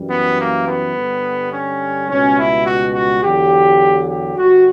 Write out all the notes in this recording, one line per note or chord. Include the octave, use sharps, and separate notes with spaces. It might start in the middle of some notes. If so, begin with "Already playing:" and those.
Already playing: F#2 E3 G3
B3
A#3
B3
G2 D3 G3
C#4
C#2 B2 G3 C#4
E4
F#4
F#4
E2 D3 F#3 G4
G4
G2 D3 G3 F#4